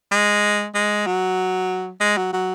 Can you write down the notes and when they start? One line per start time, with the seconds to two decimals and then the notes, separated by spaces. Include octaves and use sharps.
0.11 G#3
0.74 G#3
1.06 F#3
2.01 G#3
2.17 F#3
2.33 F#3